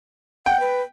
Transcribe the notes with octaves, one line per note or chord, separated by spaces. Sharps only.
F#5 G5
B4